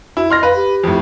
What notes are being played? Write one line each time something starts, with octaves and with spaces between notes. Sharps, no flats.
E4 F#4
D#5 C6 F6 A#6
B4 F5
G4
F2 A2